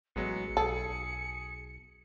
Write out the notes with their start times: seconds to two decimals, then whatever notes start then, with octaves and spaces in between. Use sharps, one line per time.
0.16 A1 F#3 G#3 B3 C#7
0.57 B1 G#4 A4